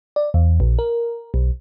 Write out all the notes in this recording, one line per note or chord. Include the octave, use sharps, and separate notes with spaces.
D5
E2
A#1
A#4
B1